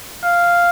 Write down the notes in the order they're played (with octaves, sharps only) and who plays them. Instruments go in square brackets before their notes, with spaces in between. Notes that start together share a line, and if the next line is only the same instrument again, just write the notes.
[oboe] F5